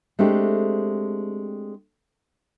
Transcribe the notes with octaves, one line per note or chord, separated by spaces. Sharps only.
G#3 A3 C4 D4 G4